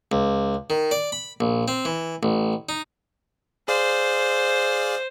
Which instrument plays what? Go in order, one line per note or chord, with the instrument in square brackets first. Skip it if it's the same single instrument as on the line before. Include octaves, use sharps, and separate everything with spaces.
[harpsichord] C#2
D#3
D5
B5
A#1
C4
E3
A1
D#4
[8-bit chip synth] G#4 D5 F5 [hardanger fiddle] C5